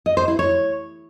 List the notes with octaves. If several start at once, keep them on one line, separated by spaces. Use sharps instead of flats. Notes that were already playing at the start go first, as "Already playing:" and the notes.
D#5
C5
E4
C#5